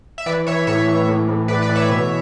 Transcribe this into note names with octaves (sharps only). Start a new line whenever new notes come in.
E5
E3 B4 D5
E3 C#5 E5
A2 C#5 E5
E3
A2
A2
A2 B4 D5
B4 D5
E3
C#5 E5
B2